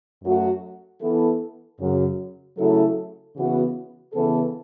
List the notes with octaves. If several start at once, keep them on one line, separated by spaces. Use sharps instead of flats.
F#2 F#3 A3 F#4
E3 B3 E4 A4
F#2 C#3 F#3
C#3 F#3 A3 E4 A4
C#3 E3 B3 F#4
C#3 E3 B3 A4